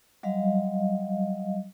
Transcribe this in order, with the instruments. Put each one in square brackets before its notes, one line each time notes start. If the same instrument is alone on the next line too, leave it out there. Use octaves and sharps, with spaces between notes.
[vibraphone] F#3 G3 D#5 F5